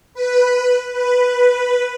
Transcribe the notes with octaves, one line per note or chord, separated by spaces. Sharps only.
B4
B4